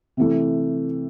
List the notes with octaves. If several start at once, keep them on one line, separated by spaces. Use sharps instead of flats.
C3 E3 A3